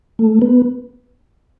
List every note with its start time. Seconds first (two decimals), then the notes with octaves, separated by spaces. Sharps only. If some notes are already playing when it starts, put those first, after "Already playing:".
0.19 A3
0.42 B3